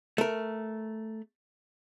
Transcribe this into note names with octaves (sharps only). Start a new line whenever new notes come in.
A3 A#4